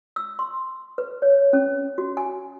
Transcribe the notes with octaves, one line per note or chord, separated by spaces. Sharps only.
E6
C6
B4
C#5
C#4
F#4
G#5